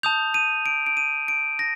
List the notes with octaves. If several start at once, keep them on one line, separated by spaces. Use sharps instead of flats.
A5 D#6 G6 F7
D#7
D7
D7
D#7
D7
A#6